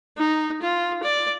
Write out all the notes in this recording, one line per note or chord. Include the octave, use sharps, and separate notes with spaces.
D#4
F4
D5